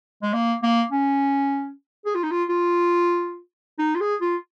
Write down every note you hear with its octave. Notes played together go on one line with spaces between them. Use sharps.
G#3
A#3
A#3
C#4
G#4
F4
D#4
F4
F4
D#4
F4
G#4
F4